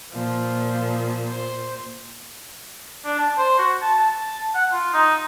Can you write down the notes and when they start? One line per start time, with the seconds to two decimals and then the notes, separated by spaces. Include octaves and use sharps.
0.13 A#2 F3
1.28 C5
3.05 D4
3.19 A5
3.38 C5
3.59 F#4
3.82 A5
4.00 A5
4.55 F#5
4.72 F4
4.94 D#4